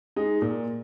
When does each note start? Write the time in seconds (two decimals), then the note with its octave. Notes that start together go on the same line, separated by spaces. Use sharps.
0.16 G#3 D#4 G#4
0.42 A#2